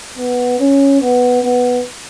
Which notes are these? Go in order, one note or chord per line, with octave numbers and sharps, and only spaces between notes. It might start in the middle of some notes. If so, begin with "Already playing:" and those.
B3
C#4
B3
B3